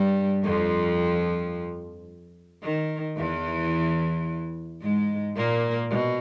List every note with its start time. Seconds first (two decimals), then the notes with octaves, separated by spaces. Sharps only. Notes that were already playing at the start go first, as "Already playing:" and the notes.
Already playing: G2 G3
0.44 F2 F3
2.63 D#3
3.17 E2 E3
4.82 G#2 G#3
5.36 A#2 A#3
5.90 B2